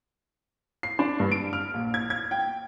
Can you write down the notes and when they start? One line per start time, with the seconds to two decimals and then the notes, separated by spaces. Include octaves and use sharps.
0.83 C7
0.99 D4
1.20 G2
1.32 D7
1.53 F6
1.74 A#1
1.94 G#6
2.10 G#6
2.31 G5